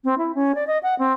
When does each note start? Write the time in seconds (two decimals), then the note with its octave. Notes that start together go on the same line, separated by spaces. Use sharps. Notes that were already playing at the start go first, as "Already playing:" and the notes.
0.04 C4
0.18 E4
0.35 C#4
0.55 D5
0.67 D#5
0.83 F#5
0.99 C4